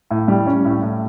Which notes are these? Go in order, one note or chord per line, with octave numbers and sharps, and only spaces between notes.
A2
G3
C#4
A2
A2